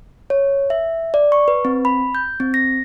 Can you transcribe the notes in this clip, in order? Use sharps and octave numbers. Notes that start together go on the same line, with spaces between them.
C#5
E5
D5
C#6
B4
C4
B5
G6
C4
A#6